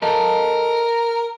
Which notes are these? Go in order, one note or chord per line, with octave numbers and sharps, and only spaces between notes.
A4 A#4 D#5 A5